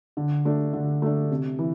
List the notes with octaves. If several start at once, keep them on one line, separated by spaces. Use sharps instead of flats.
D3
A3 D4
D3
A3 D4
C3
E3